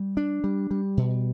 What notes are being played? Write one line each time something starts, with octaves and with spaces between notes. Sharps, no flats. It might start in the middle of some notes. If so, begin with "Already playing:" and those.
Already playing: G3
D4
G3
G3
B2